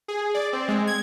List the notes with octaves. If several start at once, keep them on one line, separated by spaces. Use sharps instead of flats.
G#4
D5
C4
G#3
G#6